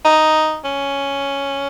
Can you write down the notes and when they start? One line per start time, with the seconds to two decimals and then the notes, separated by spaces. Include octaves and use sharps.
0.05 D#4
0.65 C#4